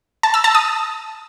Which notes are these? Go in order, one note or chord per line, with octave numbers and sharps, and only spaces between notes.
A5
E6
A5
D#6